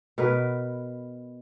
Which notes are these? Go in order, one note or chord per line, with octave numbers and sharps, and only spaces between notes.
B2 A#4 B4